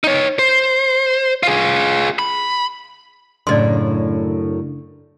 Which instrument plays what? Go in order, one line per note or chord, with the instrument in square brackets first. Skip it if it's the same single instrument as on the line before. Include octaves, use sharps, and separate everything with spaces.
[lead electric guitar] D#4 C#5
C5
F4 G#4
B5
[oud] F#2 A2 [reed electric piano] C#3 D4 [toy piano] D5 D#5 C6